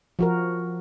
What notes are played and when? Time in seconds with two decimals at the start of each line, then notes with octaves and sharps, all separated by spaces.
0.19 F3 F#4 A#4